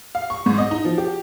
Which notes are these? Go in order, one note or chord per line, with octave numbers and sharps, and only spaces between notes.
F5
C#6
G#2
D#5
D#4
F3
G4